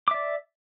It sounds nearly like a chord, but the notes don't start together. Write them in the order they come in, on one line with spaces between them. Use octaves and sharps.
D6 E5 D5